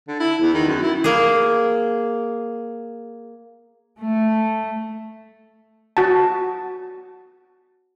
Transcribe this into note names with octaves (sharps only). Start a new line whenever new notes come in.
D3
E4
E2
D#3
F#2
E4
A#3 G#4
A3
F#4 A5